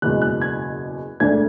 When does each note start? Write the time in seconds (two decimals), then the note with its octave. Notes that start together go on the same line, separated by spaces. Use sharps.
0.02 F#1 E2 B2 G#3 F#6
0.22 F#6
0.41 G#6
1.20 E1 D2 D3 A3 D4 G#6